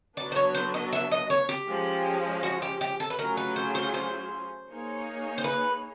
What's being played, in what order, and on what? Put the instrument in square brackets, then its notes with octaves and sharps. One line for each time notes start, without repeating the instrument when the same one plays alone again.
[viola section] D3 F#3 B3 D4 [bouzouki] D5
[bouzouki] C5
C#5
C5
D#5
E5
D#5
C#5
G4
[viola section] F3 G#3 C#4
[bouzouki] F#4
G4
G4
A4
B4
[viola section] F#3 A3 C#4 F4 G#4 [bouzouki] A#4
[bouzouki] B4
C5
C5
C5
[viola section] A#3 D#4 G#4 C#5
[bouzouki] C5
B4